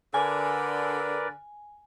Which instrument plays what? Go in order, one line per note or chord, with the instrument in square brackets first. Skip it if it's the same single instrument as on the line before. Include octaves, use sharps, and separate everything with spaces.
[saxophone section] D3 [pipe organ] A#4 B4 D5 [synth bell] G#5